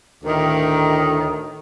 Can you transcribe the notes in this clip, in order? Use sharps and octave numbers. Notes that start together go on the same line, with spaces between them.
D2 A2 D#3